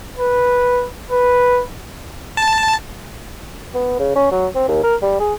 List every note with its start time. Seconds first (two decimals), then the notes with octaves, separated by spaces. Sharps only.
0.18 B4
1.11 B4
2.37 A5
3.74 B3
3.99 C#3
4.16 C#4
4.31 F#3
4.55 C4
4.68 D#2
4.83 A#4
5.02 G3
5.20 G#4